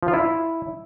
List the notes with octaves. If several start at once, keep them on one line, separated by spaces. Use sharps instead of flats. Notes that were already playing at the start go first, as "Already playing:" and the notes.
F3
F4
E4